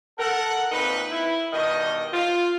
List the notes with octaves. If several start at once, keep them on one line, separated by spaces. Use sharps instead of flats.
A4 A#4 F#5
A#2 C4 D#4 B4
E4
G2 B2 D#3 D#5
F4